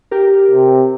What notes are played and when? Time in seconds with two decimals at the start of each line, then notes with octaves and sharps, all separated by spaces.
0.11 G4 A#4
0.51 C3